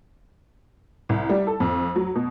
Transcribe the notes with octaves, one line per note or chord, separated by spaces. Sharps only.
C2
G3
A4
F2
F#3
B2